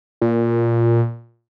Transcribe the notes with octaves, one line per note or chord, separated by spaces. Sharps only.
A#2